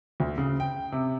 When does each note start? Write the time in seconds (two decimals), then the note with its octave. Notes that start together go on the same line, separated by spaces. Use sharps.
0.20 D2
0.38 C#3
0.60 G5
0.92 C3